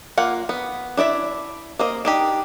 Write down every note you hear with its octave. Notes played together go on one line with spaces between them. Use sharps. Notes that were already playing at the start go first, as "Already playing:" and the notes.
A#3 F4 F#5
B3
D4 E4 D5 E5
A#3 C5 D#5
D4 D#4 G4